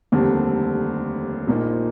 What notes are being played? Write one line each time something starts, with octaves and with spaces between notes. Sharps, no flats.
F1 D#2 D3 G3 C4
A#1 A#2 F3 A#3 D#4